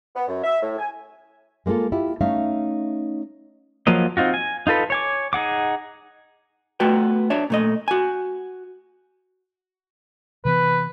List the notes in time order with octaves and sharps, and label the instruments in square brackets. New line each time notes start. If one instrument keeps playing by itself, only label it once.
[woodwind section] B3
F#2
E5
A2
G#5
[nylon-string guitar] G#3 A#3 D#4 F4 A4
E4 F4 G4
A3 C#4 D#4 E5 F5
[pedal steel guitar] F3 F#3 A#3 D#5
C4 D#4 F4 F#4
G#5
D#4 F4 A4 B4
C#5 G#5 D6
D#4 G#4 F#5 D6
[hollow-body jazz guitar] A3 B3 F4 F#4 B4 G5
D4 C#5 E5
A#2 A3 D#5
F#4 G#5
[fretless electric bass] C3 E3 B3 [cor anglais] B4